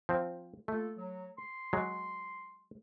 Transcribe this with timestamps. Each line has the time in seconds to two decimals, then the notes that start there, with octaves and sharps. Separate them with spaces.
0.09 F3 C4
0.68 A3 A#3 F4 A4
0.96 F#3
1.37 C6
1.73 F#3 G#3